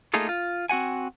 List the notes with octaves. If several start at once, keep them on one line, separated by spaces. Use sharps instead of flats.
A3 A#3 D#4 F4 G#4 A4
F4
C4 F#4 F#5 G#5